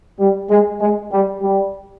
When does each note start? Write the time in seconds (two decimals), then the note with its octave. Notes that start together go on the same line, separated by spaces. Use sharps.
0.20 G3
0.50 G#3
0.81 G#3
1.12 G3
1.42 G3